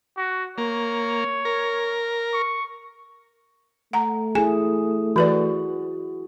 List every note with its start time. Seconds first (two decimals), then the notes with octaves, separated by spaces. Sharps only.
0.17 F#4
0.58 A#3 C#5
1.45 A#4
2.33 C#6
3.93 A3 F#5 A#5
4.35 E4 G#4 G#5
5.16 E3 F#4 B4 D5